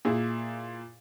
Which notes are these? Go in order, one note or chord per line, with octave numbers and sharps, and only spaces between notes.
A#2 E4 G#4